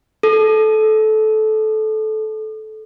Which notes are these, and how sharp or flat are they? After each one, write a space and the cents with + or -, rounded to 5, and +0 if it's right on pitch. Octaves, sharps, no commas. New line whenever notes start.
A4 -20